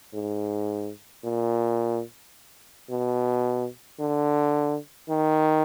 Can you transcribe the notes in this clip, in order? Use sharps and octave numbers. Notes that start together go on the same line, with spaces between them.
G#2
A#2
B2
D3
D#3